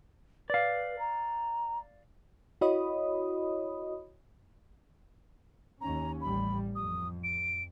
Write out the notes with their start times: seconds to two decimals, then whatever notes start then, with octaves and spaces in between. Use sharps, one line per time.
0.50 B4 D5 F5
0.99 A#5
2.61 E4 F#4 C#5 D#5 B5 D#6
5.81 D#2 C#4 A#5
6.21 A1 G3 B5
6.75 F2 D#6
7.24 D7